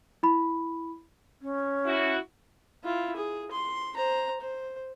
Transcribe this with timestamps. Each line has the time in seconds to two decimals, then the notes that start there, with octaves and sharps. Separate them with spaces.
0.23 E4 B5
1.42 C#4
1.85 E4 F#4
2.84 E4 F4
3.16 G#4
3.52 C6
3.96 C5 A#5
4.41 C5